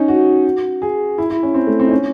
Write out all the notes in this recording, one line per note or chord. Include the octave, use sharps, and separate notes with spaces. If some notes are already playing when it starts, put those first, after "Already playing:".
Already playing: C#4 D#4
F#4
G#4
E4
E4
C#4
C4
A3
C4
D#4
C#4